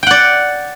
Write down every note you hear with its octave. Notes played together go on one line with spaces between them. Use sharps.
D5 F#5 G5